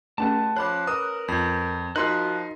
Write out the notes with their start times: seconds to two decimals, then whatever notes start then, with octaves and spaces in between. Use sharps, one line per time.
0.18 A3 C#4 G#4 A5
0.57 F3 C#5 B5 D6 F#6
0.87 A#4 B4 D#6
1.28 F2 G6
1.96 F3 D#4 F#4 A#4 C6 F#6